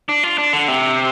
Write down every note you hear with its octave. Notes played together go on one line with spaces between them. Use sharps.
D4
F4
D4
D3
C3